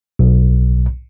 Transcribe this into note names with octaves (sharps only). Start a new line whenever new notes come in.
B1